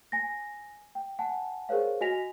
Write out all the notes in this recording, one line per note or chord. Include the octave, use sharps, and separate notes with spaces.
G#5 A#6
G5
F#5 G#5 A5
G#4 A#4 C5 C#5 F5
F#4 D#5 G#5 A#6 B6 F7